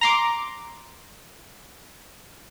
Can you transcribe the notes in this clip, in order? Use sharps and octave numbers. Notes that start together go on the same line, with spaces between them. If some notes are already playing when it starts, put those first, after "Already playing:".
A#5 C6 D6